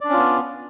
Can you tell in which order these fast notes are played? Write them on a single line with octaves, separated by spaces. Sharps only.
D5 D4 C#4 F4 B3